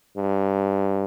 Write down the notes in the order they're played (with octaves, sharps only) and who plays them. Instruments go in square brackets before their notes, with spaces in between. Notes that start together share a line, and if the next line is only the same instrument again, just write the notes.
[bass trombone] G2